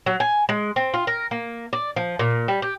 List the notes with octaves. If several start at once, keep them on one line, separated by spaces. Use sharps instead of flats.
F#3
G#5
G#3
C4
F4
A#4
A#3
D5
F3
A#2
G3
G4